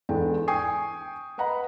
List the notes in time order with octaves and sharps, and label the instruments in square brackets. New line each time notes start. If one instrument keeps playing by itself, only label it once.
[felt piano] E2 G#2 G#3 D4 A4 G5
G5 G#5 C#6 D#6 C7
B4 D#5 F#5 A#5 B5